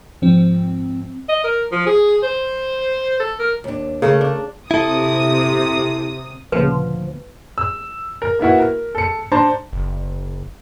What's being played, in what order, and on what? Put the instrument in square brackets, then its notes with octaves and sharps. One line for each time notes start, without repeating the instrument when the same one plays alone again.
[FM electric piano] G#2 F3 C4
[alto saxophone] D#5
A#4
F3
G#4
C5
A4
A#4
[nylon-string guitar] D#2 D4
[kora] C#3 [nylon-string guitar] A3 A4 A#4
[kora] D4
[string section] C3 D#6 [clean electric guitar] E4 A4
[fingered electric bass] D2 B3 [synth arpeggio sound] A#2 C#3 [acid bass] F3 [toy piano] B4
[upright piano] E6
A#4
A#3 B3 E4 F#4
A#4
A4 C#7
D4 C5 A5 A#5 C6
[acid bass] F#1